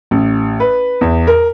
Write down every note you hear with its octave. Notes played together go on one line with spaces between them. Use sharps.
A1
B4
E2
A#4